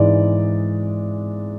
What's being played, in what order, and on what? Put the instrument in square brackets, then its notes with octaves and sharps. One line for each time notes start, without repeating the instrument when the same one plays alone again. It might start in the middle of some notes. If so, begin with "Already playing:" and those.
Already playing: [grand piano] G#2 E3 G#3 D5